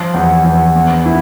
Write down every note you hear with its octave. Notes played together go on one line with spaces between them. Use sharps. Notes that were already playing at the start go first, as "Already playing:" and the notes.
Already playing: F3
E2
E2
B3
E4